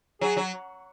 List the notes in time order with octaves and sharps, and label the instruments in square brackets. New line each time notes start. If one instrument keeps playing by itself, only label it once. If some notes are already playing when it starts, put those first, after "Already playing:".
[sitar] F#3 [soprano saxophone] G#4
[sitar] F#3